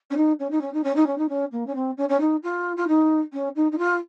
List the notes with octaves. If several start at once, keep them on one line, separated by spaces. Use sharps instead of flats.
C#4
D#4
C#4
D#4
C#4
D#4
C#4
D#4
C#4
D#4
C#4
A#3
C#4
C4
C#4
C#4
D#4
F4
F4
D#4
C#4
D#4
D#4
F4